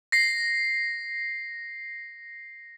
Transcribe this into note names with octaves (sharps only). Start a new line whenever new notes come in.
A#6 C7